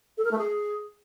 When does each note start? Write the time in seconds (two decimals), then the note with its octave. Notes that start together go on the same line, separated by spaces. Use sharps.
0.17 A4
0.24 A#4
0.31 A3
0.38 G#4